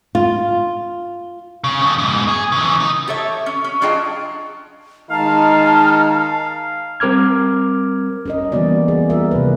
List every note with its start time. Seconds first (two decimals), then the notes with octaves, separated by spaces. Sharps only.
0.15 F4
1.64 C#3
1.81 F2 C#3
1.98 G#2 B2
2.29 G#4
2.52 C#3 E3
2.80 D#4
3.08 G4 A4 C#5 E5
3.46 C#4
3.64 C#4
3.82 F#3 D4 F4 G#4 D#5 G5
5.11 D#3 G#3 D#4 F5 A5 A#5 F6
7.00 G3 C4 A#4 D6 F6 G#6
8.26 C#4 A#4 D#5
8.52 E3 G3 A#3 B3 F#4 D5
8.88 G#4
9.10 G3 F4 A#4 E5
9.31 C3 D#3 G3 B4